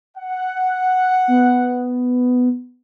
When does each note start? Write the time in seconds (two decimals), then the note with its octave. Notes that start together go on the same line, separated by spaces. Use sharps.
0.17 F#5
1.28 B3